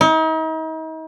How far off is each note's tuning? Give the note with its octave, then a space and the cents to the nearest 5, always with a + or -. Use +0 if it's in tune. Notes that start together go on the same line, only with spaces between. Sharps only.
D#4 +40